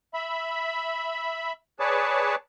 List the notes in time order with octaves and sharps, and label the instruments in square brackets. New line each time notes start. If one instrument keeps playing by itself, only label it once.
[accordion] E5 B5
G#4 B4 C#5 D5 A5